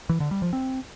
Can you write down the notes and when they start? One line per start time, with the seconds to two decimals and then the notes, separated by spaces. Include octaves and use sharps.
0.09 E3
0.20 D3
0.31 G3
0.42 F3
0.53 C4